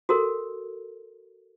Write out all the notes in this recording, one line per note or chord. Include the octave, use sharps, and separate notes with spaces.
F#4 A4 A#4